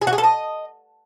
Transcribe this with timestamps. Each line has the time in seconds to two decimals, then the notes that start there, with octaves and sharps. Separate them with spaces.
0.02 G#4
0.07 F#4
0.13 G#4
0.18 A4
0.24 D#5